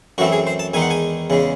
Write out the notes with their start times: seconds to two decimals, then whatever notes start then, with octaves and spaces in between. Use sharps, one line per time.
0.18 F#2 E3 A3 C4 F#4
0.32 G#4
0.47 C5
0.59 A5
0.74 E2 D#3 G#3 D#4 G#5
0.82 F#5
0.90 G#5
1.30 E2 C#3 G#3